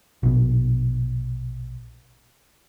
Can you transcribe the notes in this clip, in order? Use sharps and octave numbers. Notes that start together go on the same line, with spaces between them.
A#1 B2